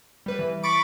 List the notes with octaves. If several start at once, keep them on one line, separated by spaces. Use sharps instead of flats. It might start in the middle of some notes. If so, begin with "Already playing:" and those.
G3 B4
E3
B5 C#6 D6 A6 D7